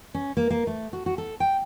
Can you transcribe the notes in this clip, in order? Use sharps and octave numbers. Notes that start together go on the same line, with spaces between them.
C#4
A#3
A#3
A3
F#4
F#4
A4
G5